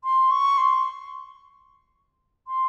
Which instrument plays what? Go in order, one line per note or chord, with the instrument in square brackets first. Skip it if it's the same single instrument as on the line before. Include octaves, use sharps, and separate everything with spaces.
[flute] C6
C#6
C6
C6